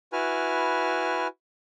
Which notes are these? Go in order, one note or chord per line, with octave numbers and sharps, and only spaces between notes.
E4 F#4 B4 G#5 F6